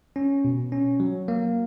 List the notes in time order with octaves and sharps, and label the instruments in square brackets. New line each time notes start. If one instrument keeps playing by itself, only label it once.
[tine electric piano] C#4
B2
C#4
F#3
A#3